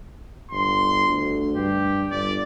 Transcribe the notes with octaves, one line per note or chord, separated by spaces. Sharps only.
G1 C6
D2
G2 G4
G1 D5